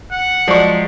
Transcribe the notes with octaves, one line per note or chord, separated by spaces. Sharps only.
F#5
F3 F#3 G#3 D5 C#6